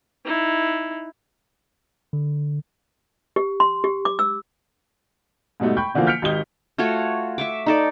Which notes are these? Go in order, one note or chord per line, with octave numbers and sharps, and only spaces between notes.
D#4 E4
D3
G4
C6
G4
D6
E6
G#2 B2 G3 A3 D#4
G5 B5 C#6 G6
B2 D3 E3 F3 A#3
F6 G6 B6 C#7 D7 F7
G#1 D#3 G4 D#5 G7
A3 F4 F#4 C#5
E5 C#6 D6
D#4 A4 D5